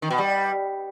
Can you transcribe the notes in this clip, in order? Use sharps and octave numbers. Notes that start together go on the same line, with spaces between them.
D#3
B2
G3